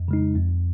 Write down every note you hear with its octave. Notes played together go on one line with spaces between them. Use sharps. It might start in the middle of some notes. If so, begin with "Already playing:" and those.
Already playing: F2
C#3 G#3 D#4
F2